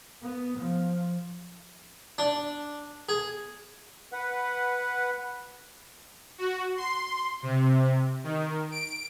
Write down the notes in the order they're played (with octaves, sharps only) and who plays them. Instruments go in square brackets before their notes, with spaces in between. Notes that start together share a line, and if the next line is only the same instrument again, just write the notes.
[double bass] B3
F3
[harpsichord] D4
G#4
[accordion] B4 F#5
[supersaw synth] F#4
C6
C3
D#3
D7